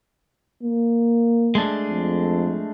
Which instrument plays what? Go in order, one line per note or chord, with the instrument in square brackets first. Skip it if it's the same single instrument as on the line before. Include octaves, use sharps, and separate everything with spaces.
[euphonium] A#3
[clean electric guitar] G#3 A3 D4
[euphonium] F2